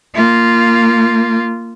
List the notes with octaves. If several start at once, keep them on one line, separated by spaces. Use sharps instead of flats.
A#3 F4